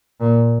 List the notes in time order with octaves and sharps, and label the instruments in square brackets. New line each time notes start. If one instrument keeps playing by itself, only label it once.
[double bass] A#2